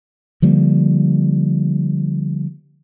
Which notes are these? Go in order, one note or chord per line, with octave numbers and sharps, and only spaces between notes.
D3 F3 G3 A#3